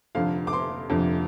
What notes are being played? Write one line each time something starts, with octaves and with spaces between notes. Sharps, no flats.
F1 F2 D3 F5
D6
C6
F1 F2 D3